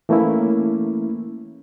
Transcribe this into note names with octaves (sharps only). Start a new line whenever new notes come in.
E3 A3 A#3 C#4 E4